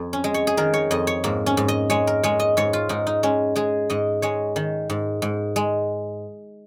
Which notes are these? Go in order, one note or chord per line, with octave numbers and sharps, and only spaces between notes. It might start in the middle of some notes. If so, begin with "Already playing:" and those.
Already playing: F2
C#4
G#3
C#5
G#4
D#3 A#4
C#5
F2 D#5
C#5
G#2 A#3
C#4
G#2
D#5
G#3 C#5
A#4
G#3 C#5
D#5
G#2 C#5
F4
G#2 D#4
D#4
G#3 C#4
G#3 G#4
G#2 D#5
G#3 C#5
D#3
G#2
G#2
G#3